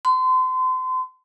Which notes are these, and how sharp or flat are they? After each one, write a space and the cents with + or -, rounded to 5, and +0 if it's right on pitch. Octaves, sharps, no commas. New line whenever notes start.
C6 -35